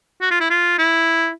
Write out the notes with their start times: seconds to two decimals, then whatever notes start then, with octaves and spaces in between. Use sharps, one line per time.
0.21 F#4
0.31 F4
0.41 E4
0.50 F4
0.78 E4